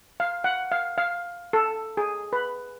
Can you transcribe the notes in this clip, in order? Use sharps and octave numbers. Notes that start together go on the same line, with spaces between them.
F5
F#5
F5
F5
A4
G#4
B4